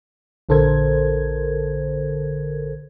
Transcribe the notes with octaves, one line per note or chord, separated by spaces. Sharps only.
A#1 D3 A4 A#4 C5 G#6